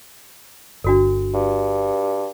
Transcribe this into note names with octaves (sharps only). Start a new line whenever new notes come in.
G1 D4 F#4 A4
G2